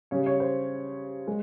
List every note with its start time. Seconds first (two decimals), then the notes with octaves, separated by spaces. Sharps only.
0.11 C#3 G3 C#5
0.26 C#5
0.40 C5
1.28 G#3